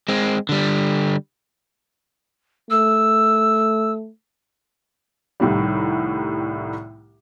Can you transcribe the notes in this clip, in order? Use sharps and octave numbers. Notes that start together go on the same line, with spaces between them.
G#3 C4
D3 G3
A3 E6
C2 A2 D#3 G3